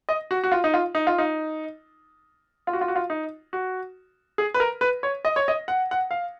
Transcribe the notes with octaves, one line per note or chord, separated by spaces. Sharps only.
D#5
F#4
F#4
F4
D#4
F4
D#4
F4
D#4
F4
F#4
F4
F#4
F4
D#4
F#4
G#4
B4
A#4
B4
C#5
D#5
C#5
D#5
F#5
F#5
F5